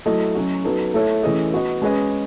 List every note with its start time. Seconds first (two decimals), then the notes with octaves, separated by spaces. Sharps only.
0.06 F#3 A3 E4 A4 D#5
0.35 F#3 C#4 F#4
0.64 F#3 B3 D#4 A4
0.94 A3 E4 A4 C#5 E5
1.23 E3 A3 C#4 G#4 D#5
1.53 B3 F#4 B4 D#5
1.82 G#3 C#4 G#4 B4 D#5